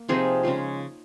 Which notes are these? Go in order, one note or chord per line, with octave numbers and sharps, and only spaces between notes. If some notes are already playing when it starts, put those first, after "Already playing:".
Already playing: A#3
C3 F3 C4 D#4 F4 G#4
C#3 G#3 C#4 F4